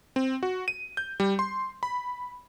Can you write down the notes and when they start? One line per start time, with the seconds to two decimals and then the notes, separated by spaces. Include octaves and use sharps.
0.16 C4
0.43 F#4
0.68 D#7
0.97 G6
1.20 G3
1.39 C6
1.83 B5